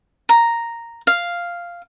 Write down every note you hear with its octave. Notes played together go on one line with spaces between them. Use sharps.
A#5
F5